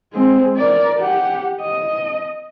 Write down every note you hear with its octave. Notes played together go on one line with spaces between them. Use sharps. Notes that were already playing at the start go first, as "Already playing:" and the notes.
G#3 C4
A#4 D5
G4 F#5
D#5